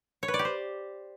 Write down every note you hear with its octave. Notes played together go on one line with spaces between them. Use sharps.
C#5
B4
D5
G4
C5